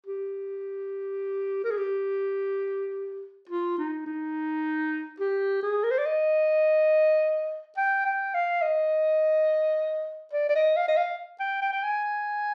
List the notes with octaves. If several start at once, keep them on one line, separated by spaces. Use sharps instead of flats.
G4
A#4
G#4
G4
F4
D#4
D#4
G4
G#4
A#4
C5
D5
D#5
G5
G5
F5
D#5
D5
D5
D#5
F5
D#5
F5
G5
G5
G5
G#5